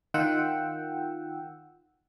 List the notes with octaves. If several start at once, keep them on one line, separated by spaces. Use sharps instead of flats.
D#3 F4 F#5 G5 E6